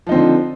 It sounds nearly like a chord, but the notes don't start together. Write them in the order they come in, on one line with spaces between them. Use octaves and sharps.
F3 D#4 C4 D3